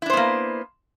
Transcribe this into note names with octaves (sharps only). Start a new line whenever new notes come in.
A#3 B3 D4 E4 C5